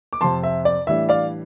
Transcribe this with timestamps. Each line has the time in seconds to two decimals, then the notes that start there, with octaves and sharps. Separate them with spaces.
0.13 D6
0.21 F2 C3 F3 A5 C6
0.43 E5
0.65 D5
0.87 A2 E3 G3 D4 E5
1.09 D5 F5